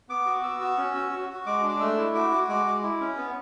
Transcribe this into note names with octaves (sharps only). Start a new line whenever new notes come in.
B3 D6
F#4
B3 E6
F#4
C#4
F#4
F#4
F#4
G#3 D6
D4
D6
A3 E6
E4
F#4 D6
F#4
G#3 D6
G#3
E4
C#4
B3